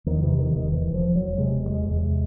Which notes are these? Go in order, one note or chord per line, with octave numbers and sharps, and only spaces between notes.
E2 D#3
C3 E3
E1 D#3
E1 D#3
E1 E3
E1
F3
E1
F#3
E1
C3 G#3
E1
E2 G#3
E2
C3